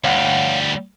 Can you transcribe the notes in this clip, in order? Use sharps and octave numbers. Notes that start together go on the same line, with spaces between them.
D2 G3 C#5 F5 F#5